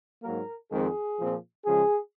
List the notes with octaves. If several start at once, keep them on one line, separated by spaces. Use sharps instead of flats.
G#2 F#3 A#3 A#4
F2 D#3 G#3 C4 G#4
A#2 F3 C4
C#3 F3 G#3 G#4